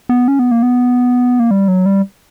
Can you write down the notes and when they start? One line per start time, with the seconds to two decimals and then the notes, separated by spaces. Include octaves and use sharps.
0.09 B3
0.28 C#4
0.39 B3
0.51 A#3
0.62 B3
1.40 A#3
1.51 G3
1.68 F#3
1.86 G3